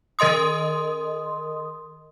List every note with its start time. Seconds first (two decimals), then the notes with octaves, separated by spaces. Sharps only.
0.19 D#3 A#4 D#5 C6 D#6